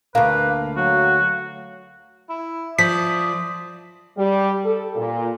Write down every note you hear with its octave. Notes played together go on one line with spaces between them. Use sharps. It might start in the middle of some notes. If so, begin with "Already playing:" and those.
D2 A#3 B4 F5
F#3 F#4
E4
F3 D5 D#6 B6
G3
A4
A#2